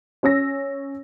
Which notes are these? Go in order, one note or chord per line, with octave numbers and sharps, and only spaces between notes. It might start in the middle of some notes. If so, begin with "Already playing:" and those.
C#4 C#5 E6 A#6